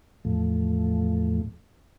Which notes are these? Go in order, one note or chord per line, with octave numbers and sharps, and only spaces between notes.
E2 A2 F3 A3